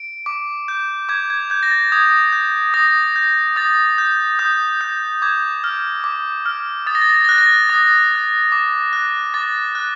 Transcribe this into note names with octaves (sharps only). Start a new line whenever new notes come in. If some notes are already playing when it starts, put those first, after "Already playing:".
Already playing: D7
D6
G6
D6 G#6
G#6
G6 G#6
A#6
A6
D#6 G#6
G6
D#6 A#6
G6
D#6 A6
G6
D#6 G6
G6
D6 G#6
F6
D6
F6
D#6 A6
A#6
A6
A#6
A6
A#6
F#6 A6
A#6
A6
D#6 A6
F#6
D6
F#6
D6 A6
F#6